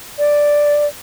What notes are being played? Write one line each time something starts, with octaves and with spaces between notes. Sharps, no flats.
D5